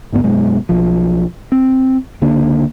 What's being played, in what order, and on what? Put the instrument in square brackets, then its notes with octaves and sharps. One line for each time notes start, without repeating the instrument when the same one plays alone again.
[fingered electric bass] G#1 D2 G#2 B3
F#2 B2 G#3
B1 F3
C4
C#2 D3 A#3 D4